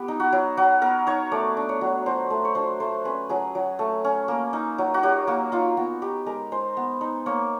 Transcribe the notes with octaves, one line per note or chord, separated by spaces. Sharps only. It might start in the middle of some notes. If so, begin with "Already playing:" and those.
Already playing: B3 G4
D#4
F#4
F#3
F#3 F#4
B3 A#4
D#4 C#5
A3 D5
D4
C#5
F#3
F#3 C5
A3
C#5
D4 C5
A3 C5
C#4 B4
F#3 G#4
F#3
A3
C#4
A#3
D#4
F#3
F#4
F#3 G4
A#3 F#4
D#4 F4
B3 F#4
D#4 G4
G#3 A#4
G#3 C5
B3
D#4
A#3 C#5